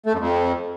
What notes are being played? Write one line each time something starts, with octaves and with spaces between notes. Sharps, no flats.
A3
F#2
F2